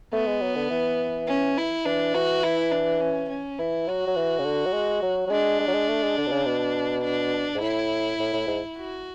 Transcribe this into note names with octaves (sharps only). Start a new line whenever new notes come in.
A3 B3
G#3
F#3
D3
E3
C#4
E4
E3 D4
E3 F#4
E4
D4
C#4
C#4
E3 E4
F#3 F#4
F#3
E3
C#3
D3
F#3
G#3
F#3
F#3
G#3 D4
G#3
F#3
G#3
A3
G#3
D3
B2
C#3
B2
D4
G#2
A2 E4
A2
A2
G#2
F#4